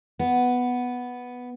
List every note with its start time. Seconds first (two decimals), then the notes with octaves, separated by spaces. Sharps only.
0.19 B3